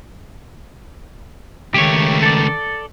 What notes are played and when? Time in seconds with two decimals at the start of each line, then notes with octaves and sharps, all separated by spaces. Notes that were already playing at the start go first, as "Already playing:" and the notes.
1.74 C#2 D#3 A3 G4 C#5
2.23 A4 D5